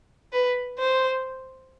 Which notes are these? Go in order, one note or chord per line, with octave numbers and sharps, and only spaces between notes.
B4
C5